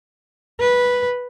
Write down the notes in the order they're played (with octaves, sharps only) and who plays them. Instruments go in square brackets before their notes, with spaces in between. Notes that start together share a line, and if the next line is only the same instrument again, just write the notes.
[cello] B4